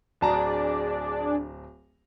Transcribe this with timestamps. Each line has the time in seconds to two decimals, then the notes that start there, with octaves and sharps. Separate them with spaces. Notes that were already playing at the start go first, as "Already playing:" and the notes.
0.21 D1 D4 G#4 D5 A5 A#5